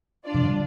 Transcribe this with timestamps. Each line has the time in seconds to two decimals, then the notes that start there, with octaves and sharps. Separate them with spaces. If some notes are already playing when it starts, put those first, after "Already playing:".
0.24 D4 F4 D5
0.34 C3 F3
0.44 D3 G3